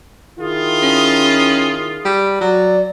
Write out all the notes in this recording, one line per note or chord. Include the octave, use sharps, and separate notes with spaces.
D#3 E4 F4 G#4
C#4
G3
F#3 D5